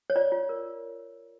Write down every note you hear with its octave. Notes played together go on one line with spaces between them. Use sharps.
C#5
F4 D5
F4
A#4